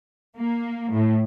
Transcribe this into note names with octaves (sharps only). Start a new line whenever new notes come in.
A#3
A2